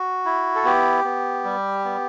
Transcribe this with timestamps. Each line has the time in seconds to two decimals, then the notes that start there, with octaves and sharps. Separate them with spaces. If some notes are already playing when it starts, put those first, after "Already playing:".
Already playing: F#4
0.25 E4
0.55 A4
0.65 B3 G4
1.04 B3
1.45 G3
1.85 B3